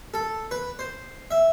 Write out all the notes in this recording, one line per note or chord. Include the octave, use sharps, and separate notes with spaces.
A4
B4
C5
E5